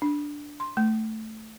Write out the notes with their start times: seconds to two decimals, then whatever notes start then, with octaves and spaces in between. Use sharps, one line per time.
0.02 D4
0.60 C6
0.77 A3